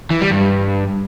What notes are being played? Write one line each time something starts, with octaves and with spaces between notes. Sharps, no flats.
E3
G3
G2